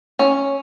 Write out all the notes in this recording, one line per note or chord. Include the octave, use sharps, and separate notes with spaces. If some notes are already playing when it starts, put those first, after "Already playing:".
C#4